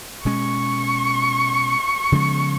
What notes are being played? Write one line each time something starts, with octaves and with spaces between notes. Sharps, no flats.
B2 G#3 C#4 C#6
C#3 F3 G#3 B3